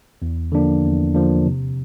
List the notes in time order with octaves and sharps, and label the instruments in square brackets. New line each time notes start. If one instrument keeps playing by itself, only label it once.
[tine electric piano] E2
D3 F3 A#3 D4
E2
D3 F3 A#3 D4
C3